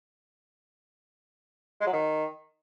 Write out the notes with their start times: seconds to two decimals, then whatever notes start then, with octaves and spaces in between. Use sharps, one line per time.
1.80 G#3
1.86 F#3
1.93 D#3